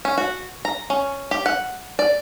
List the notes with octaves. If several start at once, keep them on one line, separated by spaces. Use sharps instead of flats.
C#4
F#4
A#5
C#4
G4
F#5
D5